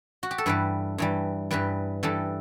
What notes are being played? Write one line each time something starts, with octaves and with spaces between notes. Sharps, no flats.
F#4
G4
A4
G2 E3 G3 B4
G2 E3 G3
G2 E3 G3 B4
G2 E3 G3 A4